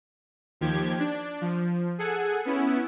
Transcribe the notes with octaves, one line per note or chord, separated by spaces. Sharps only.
D#2 F3 G4 G#6
D4
F3
G#4 A4 F#5 G#5
B3 C#4 E4